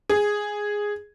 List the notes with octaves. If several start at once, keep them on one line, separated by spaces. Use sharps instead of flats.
G#4